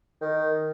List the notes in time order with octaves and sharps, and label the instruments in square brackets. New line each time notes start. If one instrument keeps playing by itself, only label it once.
[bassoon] D#3